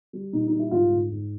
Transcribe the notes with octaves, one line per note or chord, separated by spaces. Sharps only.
G3
A#2 D#4
G3 D#4
E4
G#2 F4
G#2
G#2